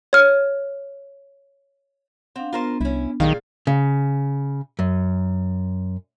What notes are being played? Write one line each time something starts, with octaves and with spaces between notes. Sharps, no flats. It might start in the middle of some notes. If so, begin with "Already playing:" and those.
C#5 F6
C4 D4 F5 F#5
B3 D4 F4 A#4 C5
C2 C#4 E4
B1 A#2 D#3 G3 G#4 F5
C#3
F#2